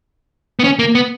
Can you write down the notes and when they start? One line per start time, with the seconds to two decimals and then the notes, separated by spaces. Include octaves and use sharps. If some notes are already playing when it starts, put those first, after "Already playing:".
0.59 B3
0.64 C#4
0.79 A#3
0.95 B3